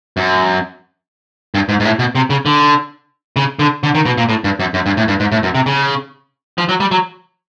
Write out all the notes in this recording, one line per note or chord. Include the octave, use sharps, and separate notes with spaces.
F#2
G2
G#2
G#2
A2
B2
C3
C#3
D3
C#3
D3
D3
D#3
B2
A#2
A2
G2
F#2
F#2
G2
A2
G2
G#2
A2
F#2
C3
C#3
F3
F#3
G3
F#3